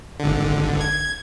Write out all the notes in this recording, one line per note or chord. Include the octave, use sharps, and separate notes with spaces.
G#1 D3
G#6